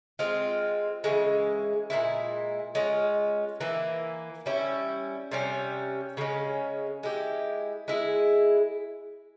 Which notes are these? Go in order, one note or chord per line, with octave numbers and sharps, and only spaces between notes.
G#3 C4 F4
C#3 E3 G#3
A#2 F3 G#3 E4
G#3 C#4 F4
E3 A#3 E4
G3 C#4 E4
C3 G3 C#4
C#3 F3 G#3 C#4
G#3 E4 G4
G#3 E4 G#4